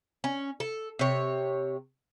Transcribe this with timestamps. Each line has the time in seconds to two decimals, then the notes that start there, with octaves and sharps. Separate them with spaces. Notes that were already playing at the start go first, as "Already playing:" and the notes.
0.24 C#4
0.60 A4
0.99 C3 C#5